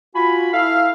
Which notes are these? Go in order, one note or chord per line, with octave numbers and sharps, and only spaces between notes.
F4 F#4 G#5 B5
E4 A4 E5 F5